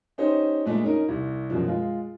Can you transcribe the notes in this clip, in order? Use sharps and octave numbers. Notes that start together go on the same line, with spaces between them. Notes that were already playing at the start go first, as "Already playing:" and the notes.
C#4 D#4 G4 C5 C#5 D#5
A#2 G#3 A3 D4
C#4 D#4 A#4
C2
F#2 B2 F3
G#3 F4